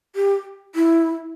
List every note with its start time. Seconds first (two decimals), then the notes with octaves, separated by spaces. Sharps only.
0.16 G4
0.75 E4